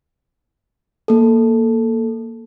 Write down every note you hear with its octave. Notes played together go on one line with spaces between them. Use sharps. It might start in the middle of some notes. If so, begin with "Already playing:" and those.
A#3 A4